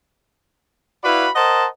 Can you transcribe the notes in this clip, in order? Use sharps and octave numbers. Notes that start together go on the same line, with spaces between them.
E4 F#4 B4 D5 F5 B5
A#4 C5 D#5 F#5 A5